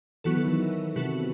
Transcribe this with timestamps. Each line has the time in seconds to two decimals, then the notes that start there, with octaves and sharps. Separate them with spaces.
0.24 E3 F#3 B3 F#4 A4
0.37 D#3
0.48 E3
0.96 C3 F#3 B3 F#4 A4